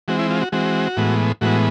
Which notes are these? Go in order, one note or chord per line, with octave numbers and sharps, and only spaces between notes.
E3 G#3 C4 F#4
E4
F4
F#4
E3 G#3 C4 F#4
A2 E3 G#3 B3
A2 E3 G#3 B3 F#4